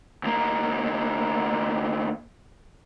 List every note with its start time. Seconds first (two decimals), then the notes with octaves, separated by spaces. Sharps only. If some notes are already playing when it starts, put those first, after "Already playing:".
0.24 D2 A#3